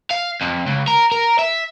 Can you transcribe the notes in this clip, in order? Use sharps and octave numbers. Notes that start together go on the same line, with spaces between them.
F5
F2
C#2
A#4
A#4
E5